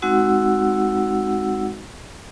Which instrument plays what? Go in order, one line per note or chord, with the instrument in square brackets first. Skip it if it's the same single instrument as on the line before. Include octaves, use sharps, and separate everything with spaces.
[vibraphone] G#3 C4 D#4 F#4 F#5 E6